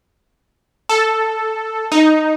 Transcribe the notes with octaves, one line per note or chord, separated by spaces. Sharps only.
A4
D#4